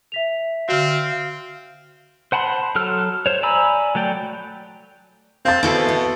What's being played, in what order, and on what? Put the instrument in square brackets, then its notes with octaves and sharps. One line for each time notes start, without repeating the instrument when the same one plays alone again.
[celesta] E5 B6 F7
[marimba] D3 F#4 [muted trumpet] C4 [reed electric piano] F5 F6
[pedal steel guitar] C5 F#5 A5 B5 C6
F#3 A4 F6
C5 C#5
D5 G#5 A#5 B5 E6
F#3 A3 D5 G5
[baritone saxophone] C4 [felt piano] F5 A6
[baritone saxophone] B2 [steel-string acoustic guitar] E4 G#4 [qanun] A4 C5 D6
[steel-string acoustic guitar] B3